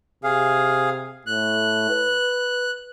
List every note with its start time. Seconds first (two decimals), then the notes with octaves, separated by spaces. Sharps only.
0.24 C3 G#4 F5
1.27 A2 F#6
1.90 B4